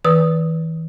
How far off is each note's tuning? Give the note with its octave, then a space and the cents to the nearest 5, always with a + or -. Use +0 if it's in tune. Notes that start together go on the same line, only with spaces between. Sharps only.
E3 -35 B4 -10 D#6 +0